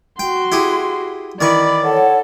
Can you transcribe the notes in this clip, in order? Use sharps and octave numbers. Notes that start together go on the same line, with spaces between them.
F#4 G5 C6
E4 G4 G#4
D#3 E3 D5 B5 C#6
A4 C#5 F#5